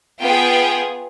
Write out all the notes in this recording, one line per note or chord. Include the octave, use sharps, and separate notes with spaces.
B3 F4 G#4 G5